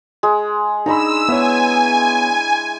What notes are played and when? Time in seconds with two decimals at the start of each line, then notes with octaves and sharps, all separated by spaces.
0.23 G#3
0.86 G#3 D4 D#4 A#5 B5 E6
1.28 B3 E4 B4 C#5 G#5